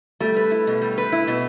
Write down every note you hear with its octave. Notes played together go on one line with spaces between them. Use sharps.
G3 A3
B4
E4
B2
G3
B4
E4
B2